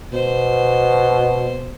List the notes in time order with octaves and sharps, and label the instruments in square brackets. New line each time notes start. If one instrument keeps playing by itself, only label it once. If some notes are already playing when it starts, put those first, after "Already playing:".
[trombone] B2 [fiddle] C5